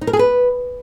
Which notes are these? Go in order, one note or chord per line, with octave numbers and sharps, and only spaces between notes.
D#4
A#4
G#4
B4